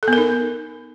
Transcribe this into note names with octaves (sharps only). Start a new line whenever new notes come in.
A4
B3
A#4
D#4